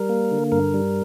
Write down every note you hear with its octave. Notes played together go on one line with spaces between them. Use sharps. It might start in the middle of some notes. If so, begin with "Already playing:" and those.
Already playing: G3 A#4
A#3
D3
G2 A#4
G3